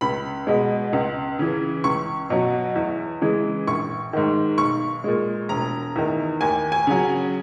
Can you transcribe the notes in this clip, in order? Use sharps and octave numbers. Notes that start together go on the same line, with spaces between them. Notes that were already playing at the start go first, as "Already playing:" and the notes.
C#2 B5
B2 G#3
C#2
C#3 E3
C#2 C#6
B2 F#3
E2
C#3 E3 G#3
A#1 C#6
G#2 D#3
B1 C#6
A#2 G#3
E1 A#5
E2 D#3
D#2 G#5
G#5
C#3 F#3